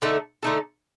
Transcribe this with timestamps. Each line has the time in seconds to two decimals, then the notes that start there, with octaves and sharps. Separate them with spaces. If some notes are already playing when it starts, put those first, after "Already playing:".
0.02 D3 A3 D#4 A4
0.43 D3 A3 D#4 A4